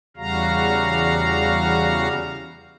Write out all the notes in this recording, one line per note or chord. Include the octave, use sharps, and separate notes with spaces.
E2 C#3 G3 F#4 F5 A#5